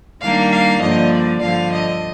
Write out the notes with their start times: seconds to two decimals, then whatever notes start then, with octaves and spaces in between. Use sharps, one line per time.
0.22 D#3 G3 A#3 D4 F5
0.52 F5
0.82 G2 D3 F3 A#3 D#5
1.13 D5
1.42 G2 D3 F3 F5
1.73 D#5